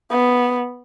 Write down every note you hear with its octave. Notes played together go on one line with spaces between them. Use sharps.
B3